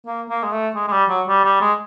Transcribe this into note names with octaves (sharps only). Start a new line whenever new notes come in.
A#3
A#3
G#3
A3
G#3
G#3
G3
F#3
G3
G3
G#3